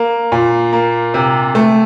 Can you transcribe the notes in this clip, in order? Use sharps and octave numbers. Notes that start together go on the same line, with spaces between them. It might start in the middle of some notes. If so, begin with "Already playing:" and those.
Already playing: A#3
A#2
A#3
C3
A3